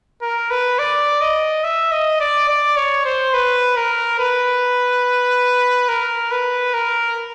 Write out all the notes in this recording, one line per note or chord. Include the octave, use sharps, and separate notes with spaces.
A#4
B4
D5
D#5
E5
D#5
D5
D5
C#5
C5
B4
A#4
B4
A#4
B4
A#4